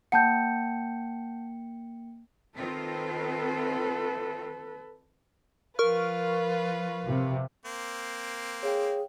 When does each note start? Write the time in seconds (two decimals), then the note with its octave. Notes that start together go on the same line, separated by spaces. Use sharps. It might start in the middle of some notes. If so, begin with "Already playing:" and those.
0.12 A#3 F#5 G5 A5 G6 C#7
2.58 D#3 C4 F4 A4 B4
5.79 F3 F4 A#4 B4 C#6 F6
7.05 C3
7.65 A#3 C4
8.63 G#4 C#5 F5 G5